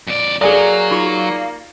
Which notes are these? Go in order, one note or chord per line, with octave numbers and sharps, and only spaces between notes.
F2 D5
F#3 A#3 G#4 A4 D5 G#5 F7
D#4 F4 C#7